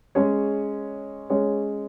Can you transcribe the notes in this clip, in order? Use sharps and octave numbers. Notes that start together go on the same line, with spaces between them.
G#3 C#4 G#4 C#5
G#3 C#4 G#4 C#5